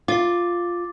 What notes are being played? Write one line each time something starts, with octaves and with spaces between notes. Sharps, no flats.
F4 D6 A6 C7